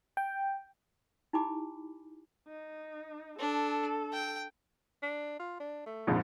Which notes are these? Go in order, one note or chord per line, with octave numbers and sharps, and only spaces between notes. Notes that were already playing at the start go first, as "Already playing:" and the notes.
G5
D#4 E4 G4 G#5 B5 D6
D#4
D4 A4
G5
D4
F4
D4
A3
A#1 F2 G#2